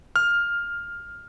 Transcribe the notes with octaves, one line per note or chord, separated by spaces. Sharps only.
F6